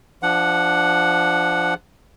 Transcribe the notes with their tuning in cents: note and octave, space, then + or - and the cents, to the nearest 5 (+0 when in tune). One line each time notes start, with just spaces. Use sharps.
F3 -15 D4 +0 F#5 +0